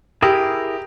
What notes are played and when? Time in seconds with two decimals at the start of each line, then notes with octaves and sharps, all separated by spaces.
0.22 E4 G4 G#4 A#4